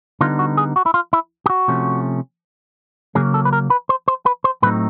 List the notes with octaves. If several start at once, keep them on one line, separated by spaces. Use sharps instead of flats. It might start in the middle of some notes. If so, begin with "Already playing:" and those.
D3 G3 B3 D#4 F4
F#4
G#4
F#4
E4
F4
E4
G4
F#4
C3 F3 A3 C#4
C#3 F#3 A#3 C#4 G#4
A4
B4
A#4
B4
C5
C5
B4
C5
A2 F#3 A3 C4 D#4 B4